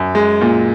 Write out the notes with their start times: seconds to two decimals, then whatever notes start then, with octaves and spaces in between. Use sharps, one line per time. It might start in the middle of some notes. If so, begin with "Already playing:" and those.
Already playing: F#2
0.15 G#3
0.41 A#2